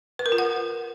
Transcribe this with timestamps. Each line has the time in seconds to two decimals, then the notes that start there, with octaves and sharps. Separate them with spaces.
0.19 B4
0.26 A#4
0.32 F4
0.38 F#5